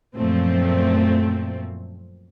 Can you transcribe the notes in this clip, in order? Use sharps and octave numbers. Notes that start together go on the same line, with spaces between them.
F#2 A#2 F3 A3 C4